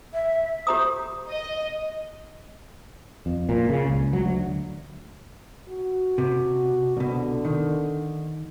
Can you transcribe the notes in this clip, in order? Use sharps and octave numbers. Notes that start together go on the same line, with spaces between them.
E5
G4 C5 A#5 D#6
D#5
F2
A#2
C#3
C#2
F#3
D2
F#4
C3
C2 B2 D3
D#3